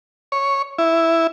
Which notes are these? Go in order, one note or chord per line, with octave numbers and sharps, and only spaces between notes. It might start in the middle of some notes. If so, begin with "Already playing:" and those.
C#5
E4